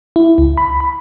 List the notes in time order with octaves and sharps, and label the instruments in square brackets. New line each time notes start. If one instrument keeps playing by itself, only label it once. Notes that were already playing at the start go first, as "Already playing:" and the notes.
[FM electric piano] E4
C#2
B5
B5